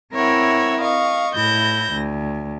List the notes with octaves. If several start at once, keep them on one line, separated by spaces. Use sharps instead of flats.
C4 E4 A#4 C#5 E5 F#5
D#5 F5 C#6
A2 E4 G6 A#6
D2